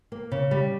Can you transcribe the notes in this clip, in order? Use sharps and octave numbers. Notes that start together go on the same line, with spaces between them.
A#3
C#3
G3